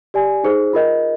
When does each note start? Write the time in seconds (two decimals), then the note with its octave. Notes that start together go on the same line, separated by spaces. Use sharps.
0.14 G4 D5 G#5
0.44 D#4 G#4 C5
0.73 F4 A#4 D#5